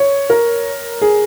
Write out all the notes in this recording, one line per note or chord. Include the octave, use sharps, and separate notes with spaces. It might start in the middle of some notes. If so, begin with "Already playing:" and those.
Already playing: C#5
A#4
G#4